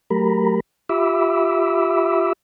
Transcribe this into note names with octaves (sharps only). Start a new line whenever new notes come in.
F#3 A3 G4 A#4 A#5 B5
F4 G4 E5 B5 D6 E6